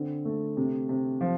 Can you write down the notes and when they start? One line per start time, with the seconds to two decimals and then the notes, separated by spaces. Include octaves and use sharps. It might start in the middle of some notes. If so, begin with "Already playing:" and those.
Already playing: D3 C4
0.25 A3
0.57 C3
0.89 C3
1.21 F3